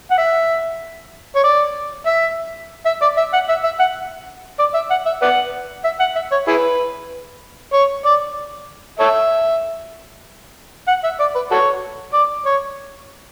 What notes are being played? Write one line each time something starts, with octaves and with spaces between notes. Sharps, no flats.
F#5
E5
C#5
D5
E5
E5
D5
E5
F#5
E5
E5
F#5
D5
E5
F#5
E5
B4 D5 F#5
E5
F#5
E5
C#5
E4 G#4 B4
C#5
D5
A4 C#5 E5
F#5
E5
D5
B4
F#4 A4 C#5
D5
C#5